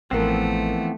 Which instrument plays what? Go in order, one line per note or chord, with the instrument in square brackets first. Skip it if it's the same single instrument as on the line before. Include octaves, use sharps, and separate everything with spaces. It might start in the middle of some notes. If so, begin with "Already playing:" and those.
[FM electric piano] A1 A#4 [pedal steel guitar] E3 B3 C4 [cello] F3 A3